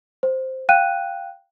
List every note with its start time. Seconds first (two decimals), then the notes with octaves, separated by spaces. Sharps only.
0.23 C5
0.69 F5 G5 F#6 D#7